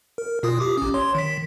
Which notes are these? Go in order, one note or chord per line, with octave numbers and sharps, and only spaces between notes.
A#4
B2 F4 D#6
G4 D6 D#6
A1 C#4
C#5 C6
D#3 B6